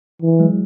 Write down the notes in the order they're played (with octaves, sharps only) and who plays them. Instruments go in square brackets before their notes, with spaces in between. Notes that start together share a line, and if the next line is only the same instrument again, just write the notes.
[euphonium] E3
[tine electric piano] F#3 G#3